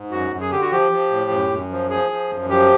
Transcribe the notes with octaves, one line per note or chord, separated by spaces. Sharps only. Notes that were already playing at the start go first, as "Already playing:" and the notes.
Already playing: G#2
F#2 F#4
F#2
G#4
D3 G4
F#4
F3 G4
F3
A2
F#2
F#2
F3
F3 G#4
F3
F#2
F3 G4